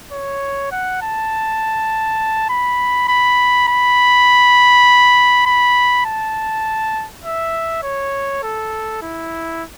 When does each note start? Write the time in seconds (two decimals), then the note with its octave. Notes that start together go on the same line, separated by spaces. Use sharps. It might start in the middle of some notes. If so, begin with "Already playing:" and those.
0.13 C#5
0.72 F#5
1.02 A5
2.49 B5
3.09 B5
3.68 B5
5.46 B5
6.05 A5
7.24 E5
7.83 C#5
8.43 A4
9.02 E4